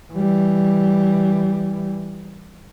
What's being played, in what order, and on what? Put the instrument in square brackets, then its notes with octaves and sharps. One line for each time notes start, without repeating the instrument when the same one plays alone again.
[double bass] E3 G3